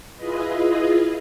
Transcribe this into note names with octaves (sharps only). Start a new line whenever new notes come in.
E4 F4 G#4 B4 D#5